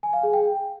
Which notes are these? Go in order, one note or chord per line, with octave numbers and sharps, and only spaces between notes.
G#5
F5
G#4
G5